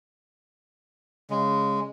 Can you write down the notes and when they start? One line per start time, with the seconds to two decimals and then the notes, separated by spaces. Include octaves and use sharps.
1.30 C#3 G#3